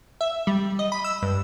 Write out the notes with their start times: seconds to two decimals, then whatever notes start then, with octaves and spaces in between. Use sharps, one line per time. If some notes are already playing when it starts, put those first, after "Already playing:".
0.21 E5
0.47 G3
0.79 D#5
0.92 B5
1.04 E6
1.23 G2